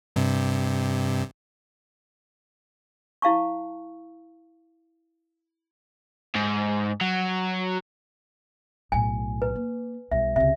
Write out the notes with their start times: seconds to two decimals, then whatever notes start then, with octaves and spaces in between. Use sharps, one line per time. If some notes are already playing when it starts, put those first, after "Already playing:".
0.16 G2 C3
3.22 E4 F5 A5 C#6
6.35 G#2
7.01 F#3
8.92 B1 A2 G#5
9.42 B4
9.55 A#3
10.11 B1 G3 E5
10.36 C#2 C3 E5